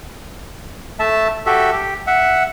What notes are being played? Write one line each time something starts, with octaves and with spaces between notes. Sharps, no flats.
A3 E5 A5
F#4 G4 A4 E5
G4
E5 F#5